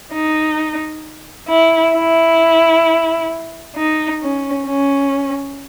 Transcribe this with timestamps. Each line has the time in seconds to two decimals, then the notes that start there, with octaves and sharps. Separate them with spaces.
0.12 D#4
1.49 E4
1.94 E4
3.76 D#4
4.22 C#4
4.67 C#4